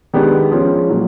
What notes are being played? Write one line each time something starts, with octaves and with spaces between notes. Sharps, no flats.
D#3 G#3 B3 D4 G4
F3 G#3 C#4
A#2 F#3